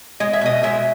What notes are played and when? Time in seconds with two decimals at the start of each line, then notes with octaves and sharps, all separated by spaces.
0.20 G#3 D#5
0.33 E5
0.41 B2 D#5
0.63 G#3 E5